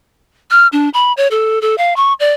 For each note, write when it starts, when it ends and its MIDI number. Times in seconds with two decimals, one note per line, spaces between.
0.51 0.67 89
0.73 0.89 62
0.94 1.13 83
1.17 1.28 73
1.31 1.61 69
1.62 1.75 69
1.78 1.94 77
1.96 2.13 85
2.20 2.33 74